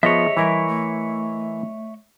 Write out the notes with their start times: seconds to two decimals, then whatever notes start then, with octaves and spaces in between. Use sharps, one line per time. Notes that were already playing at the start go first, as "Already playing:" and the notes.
0.03 F3 B3 G#4 C#5 D#5 E5
0.37 E3 G3 E4 A#4
0.68 A3